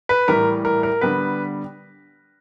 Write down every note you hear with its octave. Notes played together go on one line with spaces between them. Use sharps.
B4
A2 E3 G3 A#4
A#4
A#4
D3 G3 B3 B4